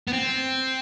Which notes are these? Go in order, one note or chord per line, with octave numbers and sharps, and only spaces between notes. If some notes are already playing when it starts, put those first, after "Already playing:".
B3
C4